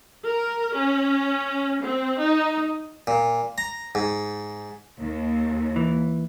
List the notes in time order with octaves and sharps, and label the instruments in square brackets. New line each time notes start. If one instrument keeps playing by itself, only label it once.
[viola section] A#4
C#4
C4
D#4
[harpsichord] A#2
A#5
G#2
[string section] D#2
[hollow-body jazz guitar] E3